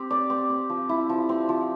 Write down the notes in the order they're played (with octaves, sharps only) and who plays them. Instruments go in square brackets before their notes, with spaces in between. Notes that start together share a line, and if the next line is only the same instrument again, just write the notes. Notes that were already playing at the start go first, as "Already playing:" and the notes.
Already playing: [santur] C4 G4
D5
C4
C4
F3
E4
F3
C4
F3